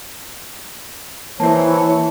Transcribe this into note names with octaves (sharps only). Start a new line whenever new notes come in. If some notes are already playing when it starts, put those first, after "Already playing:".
E3 A#3 C5 C#5 A5